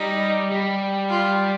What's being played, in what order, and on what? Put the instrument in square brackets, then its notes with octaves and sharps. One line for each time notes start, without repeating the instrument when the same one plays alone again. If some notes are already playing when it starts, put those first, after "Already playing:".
Already playing: [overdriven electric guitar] G3 [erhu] D#4
[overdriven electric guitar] G3
[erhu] F4